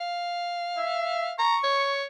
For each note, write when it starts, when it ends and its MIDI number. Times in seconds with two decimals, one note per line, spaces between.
0.01 1.32 77
0.77 1.31 76
1.38 1.56 82
1.38 1.96 85
1.63 2.05 73